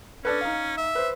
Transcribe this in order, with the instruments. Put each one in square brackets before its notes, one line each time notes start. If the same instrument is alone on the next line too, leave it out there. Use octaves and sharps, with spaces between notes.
[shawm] C#4 [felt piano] D4 A4 B4
[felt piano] D#4 F5
[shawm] E5
[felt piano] B4 C5